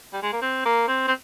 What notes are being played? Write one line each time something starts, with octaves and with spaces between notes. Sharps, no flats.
G3
G#3
A#3
C4
A#3
C4
C4